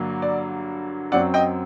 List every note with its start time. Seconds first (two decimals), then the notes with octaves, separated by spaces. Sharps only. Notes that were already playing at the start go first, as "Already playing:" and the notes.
Already playing: G2 D3 F#3 A#3
0.22 D5
1.12 F#2 F#3 C4 D5 F#5
1.34 D#5 G5